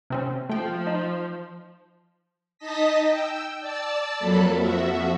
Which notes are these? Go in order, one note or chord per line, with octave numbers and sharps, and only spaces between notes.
C3 C4 C#4
F3 A3 G5
D#4
D#4 D#5 A5 D#6 A#6 B6
G5 E6
D5 A5 E6 A6
F2 F#3 A#3 A4 A5 B5
F2 F3 F#4 E5